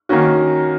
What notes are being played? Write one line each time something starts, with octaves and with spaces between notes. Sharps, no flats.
D#3 A#3 C#4 F#4